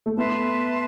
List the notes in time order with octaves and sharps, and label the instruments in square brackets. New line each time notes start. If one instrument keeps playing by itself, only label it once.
[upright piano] A3
[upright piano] B3 [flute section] B4 E5 A5 C6